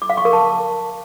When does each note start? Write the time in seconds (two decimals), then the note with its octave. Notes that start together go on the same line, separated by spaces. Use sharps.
0.02 D6
0.10 F5
0.17 C#6
0.25 A#4
0.33 A5